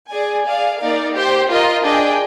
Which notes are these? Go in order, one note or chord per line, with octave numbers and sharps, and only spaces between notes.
G#4 D5 G#5
G#4 D5 F5
A#3 D#4 A#4 D5 F5
G4 C5 G5
F4 A#4 D#5
D4 G#4 D#5 G5